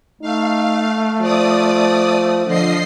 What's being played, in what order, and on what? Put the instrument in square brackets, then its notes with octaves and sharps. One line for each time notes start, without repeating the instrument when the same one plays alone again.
[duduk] A3 [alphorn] D#4 [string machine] F5
[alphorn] F3 [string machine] D5 D#6
[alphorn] D3 [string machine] F3 D#5 C7